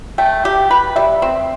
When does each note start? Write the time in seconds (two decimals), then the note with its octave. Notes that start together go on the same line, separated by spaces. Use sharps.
0.18 A3 G5
0.45 G4
0.71 B4
0.96 G3 E5
1.22 C4